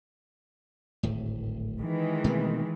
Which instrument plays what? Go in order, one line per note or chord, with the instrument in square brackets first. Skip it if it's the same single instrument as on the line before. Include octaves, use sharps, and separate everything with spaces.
[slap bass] D1 G#1 A2
[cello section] D#3 E3 G#3
[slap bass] B2 A3 C4